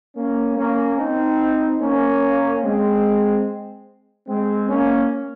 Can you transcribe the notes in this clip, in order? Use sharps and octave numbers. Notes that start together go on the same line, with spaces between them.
A#3 C#4
A#3 C#4
C4 D#4
A#3 C#4
G#3 C4
G#3 C4
A#3 C#4